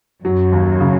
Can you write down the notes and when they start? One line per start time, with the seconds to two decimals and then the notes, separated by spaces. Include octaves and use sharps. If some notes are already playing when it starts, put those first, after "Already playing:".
0.25 F#2 F#3
0.53 D#2
0.80 C#3